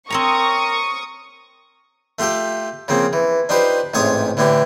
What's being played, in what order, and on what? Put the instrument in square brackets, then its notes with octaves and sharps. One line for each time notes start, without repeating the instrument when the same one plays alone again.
[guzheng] C4 C#5 A#5 [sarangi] A#4 [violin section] C#6 D#6
[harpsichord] A3 F4 G4 A4 G5
C#3 F3 A#3 C4
E3
D4 D#4 F4 G4 B4 C5
A1 G#2 C3 C#5 C#6 D#6
A2 D3 E3 D4 G4